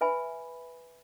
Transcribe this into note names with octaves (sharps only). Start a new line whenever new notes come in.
B4 E5 G#5 B5